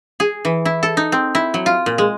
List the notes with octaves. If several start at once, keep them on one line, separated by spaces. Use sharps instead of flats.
G#4
E3
E4
A4
D#4
C4
E4
F#3
F4
A#2
G#3